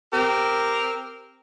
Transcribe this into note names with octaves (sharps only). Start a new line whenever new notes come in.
C4 G4 A#4